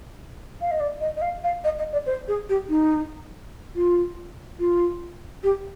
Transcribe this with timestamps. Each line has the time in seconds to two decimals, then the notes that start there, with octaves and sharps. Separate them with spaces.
0.61 F5
0.71 D#5
0.80 D5
1.00 D#5
1.16 D#5
1.21 F5
1.43 F5
1.64 D#5
1.78 D#5
1.92 D5
2.06 C5
2.27 G#4
2.49 G4
2.69 D#4
3.75 F4
4.59 F4
5.43 G4